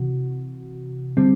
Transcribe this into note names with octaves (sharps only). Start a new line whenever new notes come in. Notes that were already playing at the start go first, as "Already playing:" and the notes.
Already playing: C3 E3 F#4
D3 G3 C4